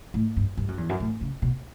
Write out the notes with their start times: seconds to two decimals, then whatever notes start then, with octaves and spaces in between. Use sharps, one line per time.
0.14 A2
0.37 G2
0.57 G2
0.68 F#2
0.78 E2
0.89 F#2
1.00 A2
1.21 C#3
1.42 B2